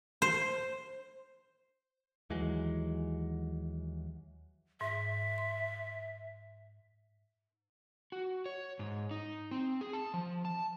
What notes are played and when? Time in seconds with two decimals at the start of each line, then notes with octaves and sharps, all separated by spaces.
0.22 C5
2.30 D#2 E3 F#3 G#3
4.81 G#2 E5
5.38 C6
8.12 F#4
8.46 C#5
8.79 G#2
9.11 D#4
9.51 C4
9.81 G#4
9.93 A5
10.14 F3
10.45 A5